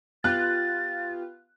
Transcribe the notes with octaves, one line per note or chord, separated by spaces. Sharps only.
B3 F4 G4 F#6 A6